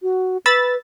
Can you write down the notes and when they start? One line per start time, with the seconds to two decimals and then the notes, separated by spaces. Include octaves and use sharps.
0.03 F#4
0.46 B4 B5 E6 A6